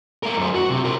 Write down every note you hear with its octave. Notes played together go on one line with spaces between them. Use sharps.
A3 A#4
F#2 C5
F#4
C3
A#4 C5